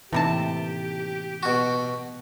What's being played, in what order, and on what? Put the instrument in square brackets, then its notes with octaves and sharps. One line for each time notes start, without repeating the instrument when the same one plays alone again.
[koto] A2 C3 A5 [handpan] E3 A#3 D#4 [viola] G4
[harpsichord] B2 F#4